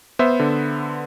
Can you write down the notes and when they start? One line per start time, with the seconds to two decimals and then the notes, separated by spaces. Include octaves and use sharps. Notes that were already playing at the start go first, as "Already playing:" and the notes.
0.19 B3 C5 E5
0.40 D3